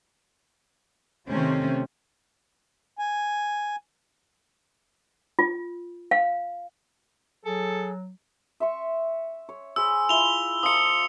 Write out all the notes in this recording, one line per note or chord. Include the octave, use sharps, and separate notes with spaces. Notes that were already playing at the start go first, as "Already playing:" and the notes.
C3 D#3 A3 C4 C#4
G#5
F4
F5
F#3 G#4 A4
E5 C6 C#6
C#5
G#4 C5 B5 E6
E4 F4 B5 F7 G7
F3 F4 A#4 D#6 C#7